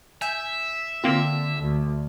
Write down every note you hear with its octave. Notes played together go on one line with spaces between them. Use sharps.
E5 G#5 G6
D3 A#3 C4 F4
D2